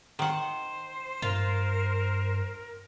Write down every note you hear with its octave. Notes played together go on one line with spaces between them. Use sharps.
D#3 C5 F#5
G2 F4 A#4